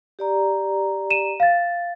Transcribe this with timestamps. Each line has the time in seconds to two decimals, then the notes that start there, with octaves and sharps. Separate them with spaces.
0.19 G4 D5 A#5
1.10 D#7 E7
1.40 F5 A6